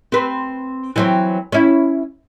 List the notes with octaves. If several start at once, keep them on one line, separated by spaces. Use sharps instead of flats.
C4 B4
E3 F#3 C4
C#4 E4